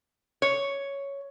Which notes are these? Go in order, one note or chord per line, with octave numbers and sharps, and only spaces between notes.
C#5